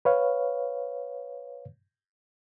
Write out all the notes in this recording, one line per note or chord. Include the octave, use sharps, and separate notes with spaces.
B4 C#5 F5